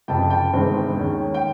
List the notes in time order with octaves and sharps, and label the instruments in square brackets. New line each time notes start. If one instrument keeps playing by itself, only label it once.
[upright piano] F#1 F2 C3 G5 A5
G5 A5
G1 G2 D#3 G#3 C4
D#2 D#3 G#3 C#4
G5